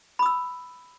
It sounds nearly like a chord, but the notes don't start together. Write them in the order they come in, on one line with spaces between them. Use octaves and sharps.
B5 D#6 E6